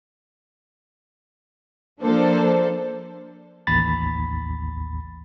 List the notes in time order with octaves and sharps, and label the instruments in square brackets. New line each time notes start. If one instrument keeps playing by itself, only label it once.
[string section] F3 A#3 D4 A4 C5
[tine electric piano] A1 D#2 B5 A6